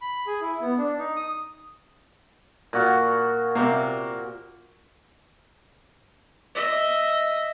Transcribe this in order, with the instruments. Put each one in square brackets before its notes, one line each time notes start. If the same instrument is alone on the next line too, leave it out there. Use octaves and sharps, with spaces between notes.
[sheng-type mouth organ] B5
G#4
E4
B3
D4
D#4
D#6
[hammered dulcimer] A#2 F#4
[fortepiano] C3 A#3
[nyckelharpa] D#5 E5